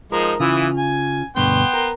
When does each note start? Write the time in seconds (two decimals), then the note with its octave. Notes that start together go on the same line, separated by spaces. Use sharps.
0.12 F3 G#3 D#4 A#4
0.40 C#3 E3 E4 F4 D#6
0.77 G#5
1.36 D2 G2 B2 B3 G5 C6
1.73 A#4